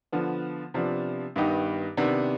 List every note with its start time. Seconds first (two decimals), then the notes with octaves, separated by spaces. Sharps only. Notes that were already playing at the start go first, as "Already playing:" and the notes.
0.12 D3 F3 B3
0.74 C3 F3 B3 D4
1.36 G2 D#3 B3 D#4 G4
1.97 C3 D#3 B3 D4